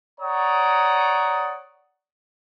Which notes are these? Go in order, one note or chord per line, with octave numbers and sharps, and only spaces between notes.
C#5 D5 F#5 A#5 C#6 D#6